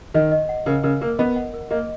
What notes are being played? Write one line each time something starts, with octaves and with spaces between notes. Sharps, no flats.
D#3 D#5
D#5
F#5
C#3 A#4
C#3 A#4
A#3 A#4
B3 D#5
F#5
A#4
A#3 D#5